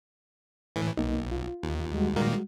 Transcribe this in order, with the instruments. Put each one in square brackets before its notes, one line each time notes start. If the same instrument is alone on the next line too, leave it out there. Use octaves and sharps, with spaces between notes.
[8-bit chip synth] A2 E3
[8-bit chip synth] B1 [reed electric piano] A#3 D#4
[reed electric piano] F4
[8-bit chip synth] D#2
[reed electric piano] G3 G#3 F#4
[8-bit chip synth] A#2 D#3 A#3